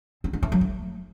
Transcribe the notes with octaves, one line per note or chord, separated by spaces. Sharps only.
C4
D#4
A3
F#3
A3